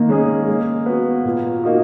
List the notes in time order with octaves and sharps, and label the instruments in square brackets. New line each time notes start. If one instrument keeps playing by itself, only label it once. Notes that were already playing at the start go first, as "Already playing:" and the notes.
Already playing: [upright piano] D#3 [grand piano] A#3
[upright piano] G#3 C#4 G#4
G#3
B3 F#4
A#2
A#3 D#4 F#4